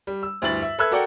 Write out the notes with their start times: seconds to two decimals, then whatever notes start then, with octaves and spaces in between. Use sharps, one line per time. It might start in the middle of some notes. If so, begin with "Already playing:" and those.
0.07 G3
0.23 E6
0.42 D2 G2 E4 A6 F#7
0.62 E5
0.79 A4 B4 E5 E6 F#6 G#6
0.91 F#4 A4 A#4 D5 F#5 G5